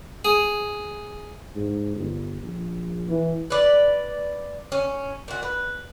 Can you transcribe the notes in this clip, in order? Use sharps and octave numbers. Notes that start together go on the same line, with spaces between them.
G#4
G#2
G1
A#1
E3
B4 D5
C#4
A#2 F#4
B4